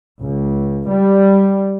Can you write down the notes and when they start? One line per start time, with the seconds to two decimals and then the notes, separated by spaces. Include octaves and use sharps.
0.23 C#2
0.89 G3